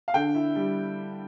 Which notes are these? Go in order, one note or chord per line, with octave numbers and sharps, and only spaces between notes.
F5
D3 G5
E4
G3